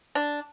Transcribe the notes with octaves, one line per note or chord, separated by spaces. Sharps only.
D4